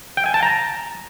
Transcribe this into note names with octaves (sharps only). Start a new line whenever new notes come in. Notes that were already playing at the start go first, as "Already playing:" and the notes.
G5
G#5
A5
A#5